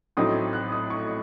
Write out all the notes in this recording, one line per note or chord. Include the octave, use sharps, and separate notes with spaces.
A1 A2 F#3 C4 D#4 D#6
F#6
D#6
C#6